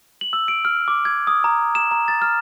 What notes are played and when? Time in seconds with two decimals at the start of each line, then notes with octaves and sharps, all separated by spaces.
0.21 F#7
0.33 E6
0.48 D7
0.65 F6
0.88 D6
1.05 G#6
1.27 D#6
1.44 A#5
1.75 E7
1.91 A#5
2.08 A6
2.22 F6